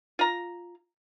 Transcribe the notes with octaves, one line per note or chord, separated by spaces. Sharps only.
F4 A#5